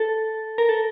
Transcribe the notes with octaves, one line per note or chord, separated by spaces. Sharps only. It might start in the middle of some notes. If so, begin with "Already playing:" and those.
Already playing: A4
A#4
A4